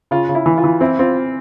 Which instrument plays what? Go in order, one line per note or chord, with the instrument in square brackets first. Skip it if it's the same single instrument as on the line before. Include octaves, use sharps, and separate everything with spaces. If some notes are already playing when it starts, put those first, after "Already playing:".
[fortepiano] C#3 [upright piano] F4
[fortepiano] C#3
[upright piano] E4
[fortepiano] E3
[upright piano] F4
[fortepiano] E3
[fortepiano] C4 [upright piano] E4
[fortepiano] C4 [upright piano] F4